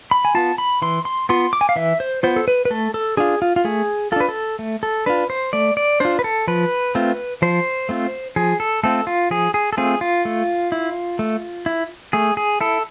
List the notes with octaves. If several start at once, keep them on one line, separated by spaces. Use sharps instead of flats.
B5
G#5
B3 F4 A5
B5
E3 C6
C6
B3 F4 C6
D6
G#5
F5
E3 E5
C5
B3 F4 C5
A4
B4
B4
A3 A4
A4
D4 F4 G#4
F4
F4
A3 G#4
D4 F4 A4 B4
A4
A3
A4
D4 F4 B4
C5
A3 D5
D5
D4 F4 C5
B4
A4
F3 B4
A3 C4 F4
F3 C5
A3 C4 F4
F3 G#4
A4
A3 C4 F4 A4
F4
F3 G#4
G#4
A4
A3 C4 F4 G#4
F4
A3
E4
A3
E4
A3 G#4
G#4
E4 A4